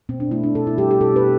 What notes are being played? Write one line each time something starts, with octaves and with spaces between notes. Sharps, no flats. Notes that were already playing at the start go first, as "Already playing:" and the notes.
B2 C4
D4
A3 E4
D4
B2 A4
E4
G3 G4
G4
B2 A4
B4